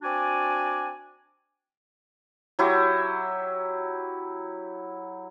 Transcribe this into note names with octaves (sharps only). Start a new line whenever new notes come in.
C4 D4 F#4 D5 G#5
F#3 E4 G4